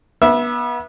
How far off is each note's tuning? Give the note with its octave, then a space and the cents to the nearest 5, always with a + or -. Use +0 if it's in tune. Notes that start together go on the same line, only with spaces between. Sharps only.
B3 -30 E5 +0